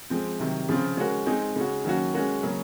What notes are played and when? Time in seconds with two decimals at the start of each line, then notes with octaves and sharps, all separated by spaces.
0.10 F3 G#3 C4
0.40 C3 D#3 F#3
0.69 C#3 F3 C4 F4
0.97 G#3 C#4 F#4 A#4
1.26 G#3 C4 D#4 G#4
1.56 C#3 G#3 C#4 F#4
1.84 D#3 F#3 A#3 C#4 F#4
2.13 G#3 C#4 F#4 A#4
2.43 C#3 F#3 A#3 C#4